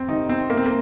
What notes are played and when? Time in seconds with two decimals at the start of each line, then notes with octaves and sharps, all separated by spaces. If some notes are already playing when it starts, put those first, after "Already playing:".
Already playing: F2 C4
0.08 C3 D#3 D#4
0.29 C4
0.50 C2 A#3
0.57 C4
0.66 A#3